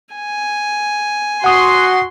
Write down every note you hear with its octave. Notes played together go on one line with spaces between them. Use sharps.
G#5
F#4 F#5 C6 D#6